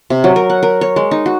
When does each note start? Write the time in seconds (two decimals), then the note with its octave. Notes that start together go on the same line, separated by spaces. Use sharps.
0.10 C3
0.24 F#3
0.36 A#4
0.50 F#5
0.63 A#4
0.81 C#5
0.96 G#3
1.11 D#4
1.26 F#4